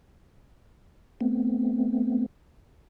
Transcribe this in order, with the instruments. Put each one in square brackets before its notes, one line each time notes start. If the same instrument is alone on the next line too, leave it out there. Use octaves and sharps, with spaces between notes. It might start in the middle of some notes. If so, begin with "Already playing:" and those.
[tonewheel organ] A3 B3 C4